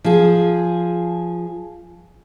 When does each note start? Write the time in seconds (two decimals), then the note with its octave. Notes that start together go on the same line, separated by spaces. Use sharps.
0.04 F3 G#4